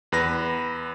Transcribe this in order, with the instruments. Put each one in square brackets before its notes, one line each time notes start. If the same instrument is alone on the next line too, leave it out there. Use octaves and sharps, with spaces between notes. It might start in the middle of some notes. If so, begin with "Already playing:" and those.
[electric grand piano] E2 B4 B5 A#6